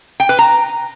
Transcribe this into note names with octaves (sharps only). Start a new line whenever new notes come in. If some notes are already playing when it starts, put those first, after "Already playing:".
G5
B4
A#5